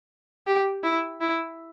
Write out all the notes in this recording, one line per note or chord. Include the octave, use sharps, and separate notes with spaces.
G4
E4
E4